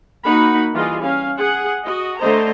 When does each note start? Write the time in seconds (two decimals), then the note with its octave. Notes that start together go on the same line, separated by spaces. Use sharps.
0.25 A#3 D#4 F#4 F#5 B5
0.73 E3 G3 F4 G4 G#4 D#5
1.02 C#4 F5
1.38 G#4 F#5
1.84 F#4 D#5
2.19 D3 A3 C5 D#5 A#5